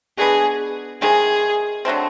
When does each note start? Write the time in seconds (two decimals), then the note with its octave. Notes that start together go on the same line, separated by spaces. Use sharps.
0.18 G#3 B3 D4 F#4 G#4
1.01 C3 D#3 G#3 G#4
1.85 D3 F#3 A3 C4